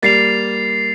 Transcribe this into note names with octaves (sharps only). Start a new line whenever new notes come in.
G3 A#3 A6 C7 F7